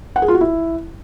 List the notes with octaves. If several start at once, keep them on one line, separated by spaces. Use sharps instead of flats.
F#5
G#4
F4
F#4
E4